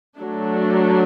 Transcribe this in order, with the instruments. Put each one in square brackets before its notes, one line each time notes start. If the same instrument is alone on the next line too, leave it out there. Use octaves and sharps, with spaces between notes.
[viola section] F#3 A3 D4